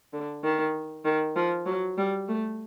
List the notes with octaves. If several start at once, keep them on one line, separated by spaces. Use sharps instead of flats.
D3
D#3
D#3
F3
F#3
G3
A3